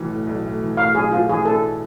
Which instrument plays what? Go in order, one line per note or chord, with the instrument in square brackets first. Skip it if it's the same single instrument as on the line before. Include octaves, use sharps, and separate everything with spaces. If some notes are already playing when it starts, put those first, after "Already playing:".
Already playing: [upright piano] B1 A2 E3 A3
A2
B1
A3
E3
[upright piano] A2 [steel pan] F5
[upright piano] B1 [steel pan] G#4
[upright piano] A3 [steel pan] F4
[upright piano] E3 [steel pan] G#4
[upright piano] A2 [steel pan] A4